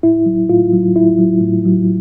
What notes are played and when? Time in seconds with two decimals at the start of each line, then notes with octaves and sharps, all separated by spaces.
0.03 A2 E4
0.26 F#3
0.49 A2 F4
0.73 F#3
0.95 A2 E4
1.18 F#3
1.41 A2
1.65 F#3